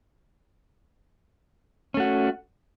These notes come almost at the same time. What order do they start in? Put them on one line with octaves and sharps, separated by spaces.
C#4 A3 F#4